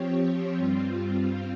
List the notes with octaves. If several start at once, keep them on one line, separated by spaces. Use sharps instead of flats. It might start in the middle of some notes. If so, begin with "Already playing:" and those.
Already playing: F3 C4 G4 C#5
G2 G3 C4 F4